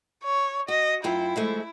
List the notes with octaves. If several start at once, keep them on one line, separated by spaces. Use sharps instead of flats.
C#5
F#4 D#5
F#2 E4 F4 G5
F3 G#3 A3